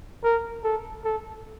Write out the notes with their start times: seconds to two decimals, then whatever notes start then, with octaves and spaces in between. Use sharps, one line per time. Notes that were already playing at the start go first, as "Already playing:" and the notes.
0.24 A#4
0.64 A4
1.05 A4